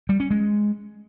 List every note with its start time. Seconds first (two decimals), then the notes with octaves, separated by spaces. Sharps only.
0.09 G3
0.20 C#4
0.31 G#3